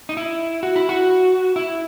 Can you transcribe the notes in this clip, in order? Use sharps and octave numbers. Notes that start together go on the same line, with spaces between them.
D#4
E4
F#4
E4
F#4
E4